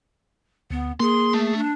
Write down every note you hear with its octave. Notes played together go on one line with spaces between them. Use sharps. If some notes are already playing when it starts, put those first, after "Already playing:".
D2 B3
A#3 G#4 C6
A3
D4